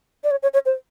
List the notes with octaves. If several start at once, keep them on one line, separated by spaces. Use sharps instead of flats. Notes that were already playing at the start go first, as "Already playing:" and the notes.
D5
C#5
C#5
C#5
C5